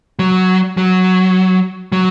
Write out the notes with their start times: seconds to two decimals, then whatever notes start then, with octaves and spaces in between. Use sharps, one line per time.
0.19 F#3
0.77 F#3
1.92 F#3